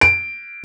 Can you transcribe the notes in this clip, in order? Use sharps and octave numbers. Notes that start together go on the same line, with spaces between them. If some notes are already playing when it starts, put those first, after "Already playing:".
D7